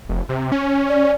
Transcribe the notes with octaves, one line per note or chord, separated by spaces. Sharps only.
F1
C3
C#4
D5